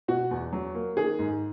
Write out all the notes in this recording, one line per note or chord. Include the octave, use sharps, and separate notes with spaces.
B2 F#4
E2
F#3
A#3
D#3 G#4
G#2